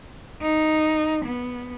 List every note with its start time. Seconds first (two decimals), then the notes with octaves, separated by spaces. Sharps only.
0.42 D#4
1.25 B3